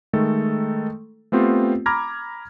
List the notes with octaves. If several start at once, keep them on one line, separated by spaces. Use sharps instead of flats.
D#3 G#3 A3 A4
A3 B3 C4 F4 G4
A#5 B5 D6 F6 G#6 A#6